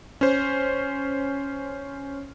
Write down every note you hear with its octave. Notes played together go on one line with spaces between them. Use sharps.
C#4 C5